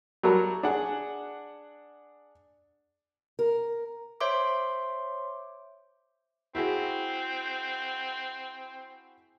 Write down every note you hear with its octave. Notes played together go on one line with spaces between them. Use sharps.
F#3 G3 F#4 A4 A#4
D4 G#4 F#5
A#4
C5 C#5 E5 C6 D6
C4 E4 F#4 G#4